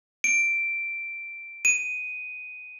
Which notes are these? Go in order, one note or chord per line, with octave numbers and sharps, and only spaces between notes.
D7
D#7